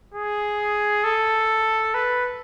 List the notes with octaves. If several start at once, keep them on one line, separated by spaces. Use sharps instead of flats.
G#4
A4
B4